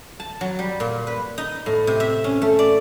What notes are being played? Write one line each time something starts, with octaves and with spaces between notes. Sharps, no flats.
A5
F#3
G3
A#2
B4
D#4
A2
C3
E5
C#4
A3
D5